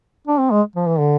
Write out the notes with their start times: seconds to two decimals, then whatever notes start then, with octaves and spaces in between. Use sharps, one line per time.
0.27 D4
0.39 C4
0.51 G#3
0.75 F3
0.87 E3
0.99 D3